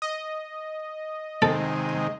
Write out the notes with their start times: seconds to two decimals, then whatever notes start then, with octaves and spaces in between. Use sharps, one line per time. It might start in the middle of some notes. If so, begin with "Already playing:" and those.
0.02 D#5
1.42 C3 D#3 G#3 A4